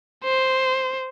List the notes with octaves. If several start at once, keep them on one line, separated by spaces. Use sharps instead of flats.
C5